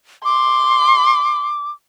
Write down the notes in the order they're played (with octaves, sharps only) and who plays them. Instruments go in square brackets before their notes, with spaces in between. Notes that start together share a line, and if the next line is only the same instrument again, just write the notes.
[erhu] C6 [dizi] D6